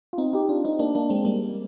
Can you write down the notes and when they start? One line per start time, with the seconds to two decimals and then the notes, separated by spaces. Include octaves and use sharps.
0.13 F4
0.18 C4 D#4
0.33 D#4 G4
0.49 D4 F4
0.65 C4 D#4
0.79 A#3 D4
0.95 A#3 D4
1.10 G#3 C4
1.25 G3 A#3